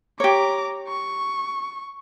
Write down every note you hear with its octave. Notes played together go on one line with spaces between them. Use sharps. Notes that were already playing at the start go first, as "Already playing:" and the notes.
G4 C#5 A#5 D6
C#6